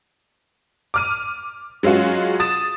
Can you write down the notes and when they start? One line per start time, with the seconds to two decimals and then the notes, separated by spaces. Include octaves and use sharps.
0.94 D6 F6 D#7
1.83 F#3 G#3 C#4 F4 F#4
2.40 D#6 A6 E7